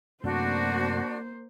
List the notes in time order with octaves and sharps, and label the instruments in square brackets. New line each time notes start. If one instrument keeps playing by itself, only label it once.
[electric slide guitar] F#2 C3 A3 [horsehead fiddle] A#3 C5 [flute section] D4 F#4